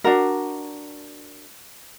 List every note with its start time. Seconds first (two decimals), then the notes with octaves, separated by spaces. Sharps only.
0.04 D4 F#4 A#4